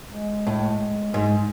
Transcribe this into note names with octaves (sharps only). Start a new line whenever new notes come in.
G#3
A2
G#2